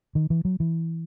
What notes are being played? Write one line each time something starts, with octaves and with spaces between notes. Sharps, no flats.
D#3
E3
F#3
E3